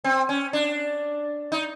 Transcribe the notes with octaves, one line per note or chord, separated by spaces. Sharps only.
C4
C#4
D4
D#4